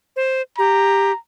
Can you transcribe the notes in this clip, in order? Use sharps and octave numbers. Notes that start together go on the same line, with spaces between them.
C5
G4 A#5